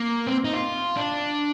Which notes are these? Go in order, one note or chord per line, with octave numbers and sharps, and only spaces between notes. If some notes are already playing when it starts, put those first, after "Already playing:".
Already playing: A#3
C4
D#4
F4
D4